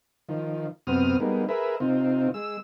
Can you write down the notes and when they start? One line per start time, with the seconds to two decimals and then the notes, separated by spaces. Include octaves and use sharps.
0.29 D#3 F3
0.87 F#2 C3 B3 C4 D#6 F6
1.20 G3 G#3 A#3 B3 D#4
1.49 G#4 A#4 B4 E5
1.80 C3 C4 D#4 F4
2.34 G#3 E6